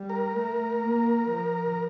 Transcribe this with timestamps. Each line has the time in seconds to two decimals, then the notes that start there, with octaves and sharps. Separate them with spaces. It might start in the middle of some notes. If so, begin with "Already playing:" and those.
Already playing: G3
0.09 A#4
0.37 A3
0.84 A#3
1.30 F3